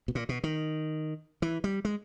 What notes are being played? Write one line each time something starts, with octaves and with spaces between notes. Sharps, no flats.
B2
A#2
B2
D#3
E3
G3
G#3